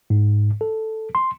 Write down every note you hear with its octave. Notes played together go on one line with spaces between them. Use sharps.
G#2
A4
C6